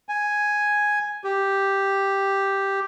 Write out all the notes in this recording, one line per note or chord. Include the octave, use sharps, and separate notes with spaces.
G#5
G4